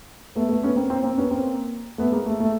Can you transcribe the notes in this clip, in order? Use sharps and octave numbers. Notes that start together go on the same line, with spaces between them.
A3 B3
A3 B3
B3 C#4
A#3 C4
A#3 C4
A#3 C4
B3 C#4
A#3 C4
A3 B3
G#3 A#3
A3
A3